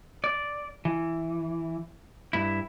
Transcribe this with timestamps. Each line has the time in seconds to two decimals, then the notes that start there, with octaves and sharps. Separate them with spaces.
0.24 D5
0.85 E3
2.33 G2 E4